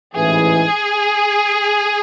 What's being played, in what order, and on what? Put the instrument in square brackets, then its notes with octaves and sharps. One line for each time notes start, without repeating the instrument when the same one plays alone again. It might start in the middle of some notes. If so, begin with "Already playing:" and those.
[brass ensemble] A1 G#2 E3 [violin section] G#4